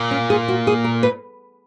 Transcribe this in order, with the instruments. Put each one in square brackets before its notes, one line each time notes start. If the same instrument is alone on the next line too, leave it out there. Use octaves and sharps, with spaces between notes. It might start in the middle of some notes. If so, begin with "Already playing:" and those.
Already playing: [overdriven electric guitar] A#2
[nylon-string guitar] C#4
G#4
F#4
G#4
A#4
B4